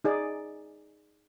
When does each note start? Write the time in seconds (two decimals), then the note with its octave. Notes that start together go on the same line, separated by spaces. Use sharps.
0.04 D#4 G#4 D5